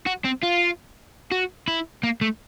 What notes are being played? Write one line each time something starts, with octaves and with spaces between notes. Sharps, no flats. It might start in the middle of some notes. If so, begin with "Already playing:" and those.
F#4
C4
F4
F#4
E4
A#3
A3